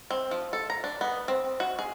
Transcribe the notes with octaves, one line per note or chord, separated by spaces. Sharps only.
C4
F3
A4
A#5
D4
B3
C4
F#4
G#4